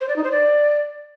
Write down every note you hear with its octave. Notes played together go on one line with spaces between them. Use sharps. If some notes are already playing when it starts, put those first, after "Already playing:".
C5
D5
D#4
C5
D5